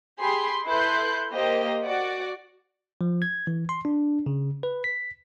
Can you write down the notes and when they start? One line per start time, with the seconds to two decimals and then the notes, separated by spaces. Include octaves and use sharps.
0.18 G4 G#4 B5 C6
0.64 E4 A4 B4 C6 F#6 G6
1.31 A#3 G4 C5 D#5
1.84 F#4 D5 F#5
3.01 F3
3.22 G#6
3.47 E3
3.69 C6
3.85 D4
4.26 C#3
4.63 B4
4.84 B6